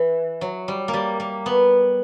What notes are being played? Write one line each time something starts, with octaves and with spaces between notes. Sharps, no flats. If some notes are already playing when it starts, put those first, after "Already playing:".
Already playing: E3
F#3
G3
A#3
G3
A#3
B3